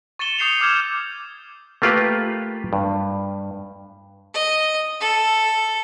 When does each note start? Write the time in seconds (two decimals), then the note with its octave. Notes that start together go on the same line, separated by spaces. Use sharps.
0.19 C#6 A6 C#7 E7 G7
0.39 C#6 D#6 G6 C7 C#7 F7
0.61 D6 E6 F6 G6 G#6 E7
1.82 A3 A#3 F4 G4 B4
2.73 G2
4.34 D#5
5.00 A4